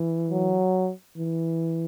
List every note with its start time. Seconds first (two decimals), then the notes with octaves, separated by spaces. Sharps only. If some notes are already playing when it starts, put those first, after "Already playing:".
Already playing: E3
0.31 F#3
1.17 E3